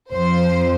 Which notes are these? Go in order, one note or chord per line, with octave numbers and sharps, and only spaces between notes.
F2 F3 C5